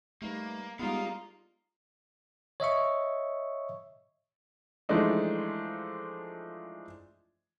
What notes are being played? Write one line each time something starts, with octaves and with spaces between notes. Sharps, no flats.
G3 A3 A#3 D#4 B4
G3 G#3 B3 D#4 F4 A#4 F5
C#5 D#5 E5 C#6
E3 F3 G#3 A3 D4 D#4